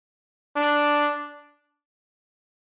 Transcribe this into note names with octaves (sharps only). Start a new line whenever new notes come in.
D4